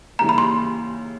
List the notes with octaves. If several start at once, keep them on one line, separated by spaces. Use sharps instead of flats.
D#2 C#3 E3 G3 A#3 A#5
B5
C6